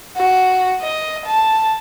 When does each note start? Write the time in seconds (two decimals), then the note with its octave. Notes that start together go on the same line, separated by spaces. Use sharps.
0.17 F#4
0.82 D#5
1.26 A5